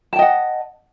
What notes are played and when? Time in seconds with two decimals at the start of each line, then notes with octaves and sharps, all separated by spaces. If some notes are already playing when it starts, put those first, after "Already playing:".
0.13 A5
0.16 G5
0.19 D#5
0.22 F#5